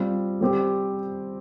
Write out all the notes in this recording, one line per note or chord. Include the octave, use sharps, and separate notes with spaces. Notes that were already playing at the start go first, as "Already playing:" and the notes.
Already playing: G3 C4 F4
G3 C4 G4 C5